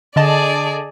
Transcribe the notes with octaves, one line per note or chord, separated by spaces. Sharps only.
D3 G#4 D5 D#5 A5